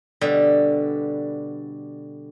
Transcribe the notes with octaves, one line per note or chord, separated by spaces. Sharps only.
B2 D3 G3